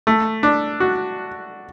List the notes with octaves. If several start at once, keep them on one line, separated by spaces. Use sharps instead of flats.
A3
D4
F#4